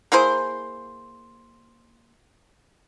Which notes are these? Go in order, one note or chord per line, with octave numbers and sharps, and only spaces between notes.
A#3 E4 G#4 C5